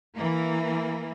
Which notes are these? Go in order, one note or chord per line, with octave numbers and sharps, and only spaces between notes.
E3 A#3